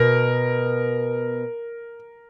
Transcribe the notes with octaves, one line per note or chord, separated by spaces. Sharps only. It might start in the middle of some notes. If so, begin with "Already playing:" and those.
Already playing: B2 A#4